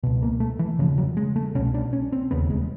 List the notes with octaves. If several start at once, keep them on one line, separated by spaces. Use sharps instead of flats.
C#2 B2
A#3
A3
E3
E1 D#2 C#3 F3
F#3
G#3
A3
C2 B2 C#4
D4
C#4
C4
E1 D#2 C#3 B3
G#3